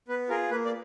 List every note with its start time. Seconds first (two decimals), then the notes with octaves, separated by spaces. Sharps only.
0.08 B3 B4
0.29 F4 G#4 A#4
0.51 A#3 B4
0.65 D5